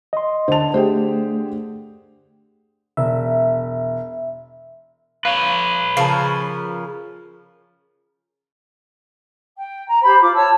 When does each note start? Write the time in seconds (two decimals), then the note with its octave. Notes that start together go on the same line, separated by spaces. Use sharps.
0.13 D#5 C6
0.48 D3 C5 A5 F7
0.74 A3 G4 G#4 C5
2.97 E1 E5
5.25 B4 C#5 F5
5.97 C#3 F3 A#4 F5 A5
9.56 G5
9.87 A#5
10.03 G4 C5 B5
10.21 F4 D6
10.34 C#5 A5 E6